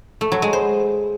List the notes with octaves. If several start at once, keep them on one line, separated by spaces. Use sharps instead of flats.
A3
F#3
G#3
C5